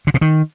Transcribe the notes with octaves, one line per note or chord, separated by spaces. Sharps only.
D3
B2
D#3